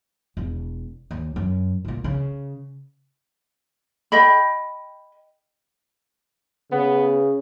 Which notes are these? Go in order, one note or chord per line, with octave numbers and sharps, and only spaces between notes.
E1
D#2
F#2
C2 A#2
C#3
D#5 G5 B5
C#3 B3